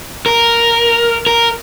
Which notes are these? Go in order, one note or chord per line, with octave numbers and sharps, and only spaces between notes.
A#4
A#4